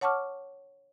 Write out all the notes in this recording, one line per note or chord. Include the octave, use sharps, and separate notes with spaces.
C#5 F#5 A5 C#6 D6 F6